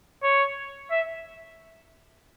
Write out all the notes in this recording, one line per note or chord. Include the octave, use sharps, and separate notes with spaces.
C#5
E5